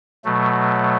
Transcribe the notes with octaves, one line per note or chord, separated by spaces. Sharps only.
B2 F#3 A3